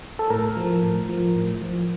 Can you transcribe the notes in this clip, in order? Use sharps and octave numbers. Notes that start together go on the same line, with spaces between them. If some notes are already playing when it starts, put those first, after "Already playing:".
A4
A2 A#4
F3
A2
F3
A2
F3